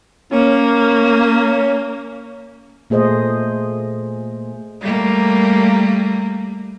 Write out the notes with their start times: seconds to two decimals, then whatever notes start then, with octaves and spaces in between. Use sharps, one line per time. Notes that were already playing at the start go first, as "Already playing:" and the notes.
0.32 A#3 C#4
2.90 A#2 A3 G#4 C5 D#5
4.81 G3 A3 A#3